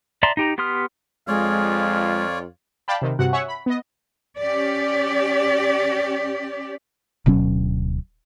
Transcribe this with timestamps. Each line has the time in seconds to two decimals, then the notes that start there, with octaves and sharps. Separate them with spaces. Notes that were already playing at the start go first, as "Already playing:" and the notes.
0.23 D5 E5 A5 A#5 C6
0.37 D#4 G4 A#5
0.58 B3 G4 C6 D#6 F6
1.28 F2 G#3 F4 C#5 D5 F5
2.88 D5 F5 G5 A5 B5
3.02 C3 D#3
3.19 G2 C3 F#4 F#5
3.33 C#5 E5 F#5 G#5 C#6
3.48 B5
3.66 B3 D#5
4.39 C#4 G4 D5
7.26 D1 B2 F#3 C#4